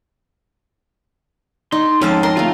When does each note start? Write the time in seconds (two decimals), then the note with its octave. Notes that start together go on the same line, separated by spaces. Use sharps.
1.72 D#4 C6
2.01 F2 G#2 C#4 F5 A5
2.23 A#4 C6
2.37 A3 A#3 F4